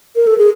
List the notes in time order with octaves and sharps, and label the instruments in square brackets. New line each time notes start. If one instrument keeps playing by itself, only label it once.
[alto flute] A#4
A4
G#4